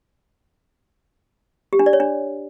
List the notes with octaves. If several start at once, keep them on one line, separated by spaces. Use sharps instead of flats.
G4
D4
D5
C#5
D4